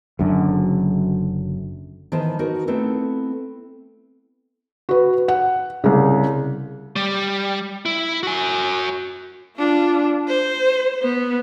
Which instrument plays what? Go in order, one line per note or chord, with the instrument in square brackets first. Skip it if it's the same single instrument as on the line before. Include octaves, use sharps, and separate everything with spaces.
[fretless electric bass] F#1 F#2 D3
[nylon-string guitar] D#3 E3 B3 A#4 C5 A5
B3 D#4 F#4 A#4
A3 B3 C4 E4 A4
[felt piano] F#4 B4
F#5
C2 C#3
[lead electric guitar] G3
E4
F#4 G#5
[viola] D4 F4
C5
B3